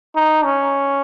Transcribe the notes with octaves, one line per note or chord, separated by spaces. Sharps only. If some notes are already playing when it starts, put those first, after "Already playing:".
D#4
C#4